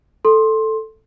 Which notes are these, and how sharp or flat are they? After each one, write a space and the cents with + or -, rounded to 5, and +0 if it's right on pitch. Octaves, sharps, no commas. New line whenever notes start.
A4 +0 C6 +15